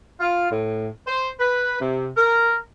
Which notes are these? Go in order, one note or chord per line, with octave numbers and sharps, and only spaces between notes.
F4
A2
C5
B4
C3
A#4